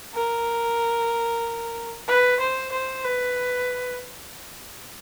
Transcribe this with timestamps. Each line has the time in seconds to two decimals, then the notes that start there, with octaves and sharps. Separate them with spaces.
0.15 A#4
2.08 B4
2.40 C5
2.72 C5
3.04 B4